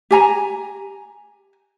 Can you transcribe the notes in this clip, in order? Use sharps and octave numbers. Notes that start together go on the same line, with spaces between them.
G4 G#5 A#5